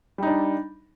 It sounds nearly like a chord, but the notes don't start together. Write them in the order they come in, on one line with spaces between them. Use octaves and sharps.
G3 D#4 D4